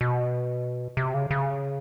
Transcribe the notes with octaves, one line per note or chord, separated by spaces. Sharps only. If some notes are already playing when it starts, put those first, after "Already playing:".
B2
C3
C#3
C#3